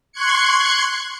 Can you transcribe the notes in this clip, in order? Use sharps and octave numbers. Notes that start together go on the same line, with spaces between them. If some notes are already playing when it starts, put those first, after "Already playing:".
C6 C#6 F#6 G#6 C#7